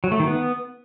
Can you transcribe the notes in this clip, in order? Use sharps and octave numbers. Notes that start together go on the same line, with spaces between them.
F#3
A3
D#3
B3